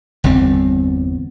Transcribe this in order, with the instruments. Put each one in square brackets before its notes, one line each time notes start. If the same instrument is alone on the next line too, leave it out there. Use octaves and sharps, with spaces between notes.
[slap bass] G1 E2 G3 C4